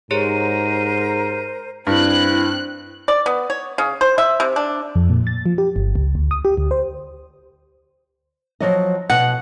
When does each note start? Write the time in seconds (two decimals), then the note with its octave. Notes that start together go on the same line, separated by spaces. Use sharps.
0.11 G#2 G4 G#4 A#4 C5 C#5 A#5 D#7
1.87 G2 C4 E4 F#6
3.08 D5
3.26 B3
3.50 C#5
3.78 C#3
4.01 C5
4.18 E5
4.40 C3
4.56 D4
4.95 F2
5.10 A#2
5.27 A6
5.46 F3
5.58 G4
5.76 G1
5.95 C#2
6.15 D2
6.31 D#6
6.45 G4
6.57 D2
6.71 C5
8.60 F3 F#3 D#5
9.10 B2 F#5